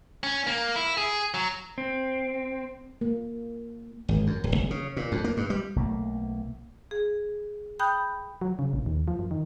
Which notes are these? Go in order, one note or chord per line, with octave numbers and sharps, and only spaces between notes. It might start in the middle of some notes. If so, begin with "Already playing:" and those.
C#4
A#3
E4
G#4
F#3
C4
A#3
G#1
F#2
D1
F#1
C#3
A#2
F2
A#3
G2
G3
B1 A3 A#3
G#4
G5 B5 D#6 F#6 G6
F#3
C#3
A#1
D#2
F3
F#2
D#3